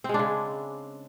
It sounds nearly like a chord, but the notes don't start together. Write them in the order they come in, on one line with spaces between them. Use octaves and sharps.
C4 G#3 D4 C#3